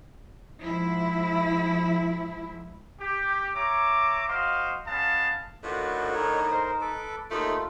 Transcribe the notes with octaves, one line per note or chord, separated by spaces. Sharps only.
G#2 F3 E4
G4
C#5 E5 A#5 D6
F#4 C5 D#5 F5
G#3 B3 C#4 F5 A5
A2 D3 D#3 F4 F#4 B4
D#4 C#5
A#4 C5
A4 B4 D6
D#2 A3 D#4 F4 A4 B5